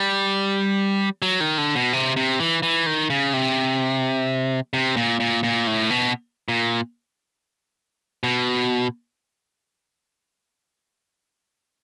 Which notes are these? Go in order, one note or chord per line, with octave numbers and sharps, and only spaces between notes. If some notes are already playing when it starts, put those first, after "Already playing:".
Already playing: G3
F#3
D#3
D3
B2
C3
C3
E3
E3
D#3
C#3
C3
C3
A#2
A#2
A#2
A2
B2
A#2
B2